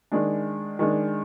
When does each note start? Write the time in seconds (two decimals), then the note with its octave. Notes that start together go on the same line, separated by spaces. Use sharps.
0.12 D#3 G#3 D4
0.79 D#3 G#3 D4